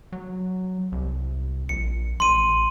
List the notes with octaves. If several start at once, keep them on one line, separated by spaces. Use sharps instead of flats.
F#3
C2
A#1 C#7
A1 C6 D#7